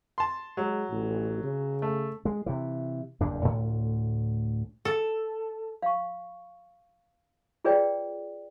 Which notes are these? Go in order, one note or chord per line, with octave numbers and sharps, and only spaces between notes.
A5 C6
F#3 G#3
A1
C#3
A3
G#3
C3 E3
F#1 E2 G2 D4
D2 A2
A4
F5 C#6
F4 G#4 B4 C#5 D5 G5